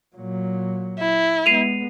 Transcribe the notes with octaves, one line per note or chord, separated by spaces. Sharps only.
A#2 F#3
E4
G#3 B3 C7 D#7 F7